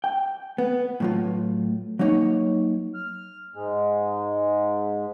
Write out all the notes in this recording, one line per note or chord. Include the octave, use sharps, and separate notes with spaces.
G5
B3
A2 F#3 F4
F#3 A#3 D#4 C#5
F6
G#2 G#3